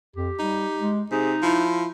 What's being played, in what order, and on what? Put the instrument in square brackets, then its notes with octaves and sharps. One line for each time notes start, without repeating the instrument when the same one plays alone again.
[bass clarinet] F2 [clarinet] G4
[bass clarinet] G3 [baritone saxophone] D#4
[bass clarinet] G#3
[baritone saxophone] C3 [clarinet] D#4 [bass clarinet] G#4
[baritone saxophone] F3 [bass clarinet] E4